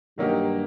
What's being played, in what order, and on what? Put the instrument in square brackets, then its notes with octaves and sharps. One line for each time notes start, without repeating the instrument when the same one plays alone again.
[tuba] G2 [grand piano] D#3 F#3 A#3 D#4 G4